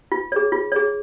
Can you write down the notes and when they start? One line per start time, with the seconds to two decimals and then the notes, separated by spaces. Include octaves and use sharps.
0.12 F4
0.32 G#4 C#5
0.52 F4
0.72 G#4 C#5